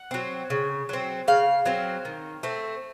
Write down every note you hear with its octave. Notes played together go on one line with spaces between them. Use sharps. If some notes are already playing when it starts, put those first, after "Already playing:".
Already playing: F#5
F#3 C4
C#3
F#3 C4
C#3 F5
F#3 C4
D#3
A3 C4